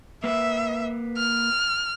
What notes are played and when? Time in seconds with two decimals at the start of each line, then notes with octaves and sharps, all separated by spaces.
0.24 A#3 B4 E5
1.17 F6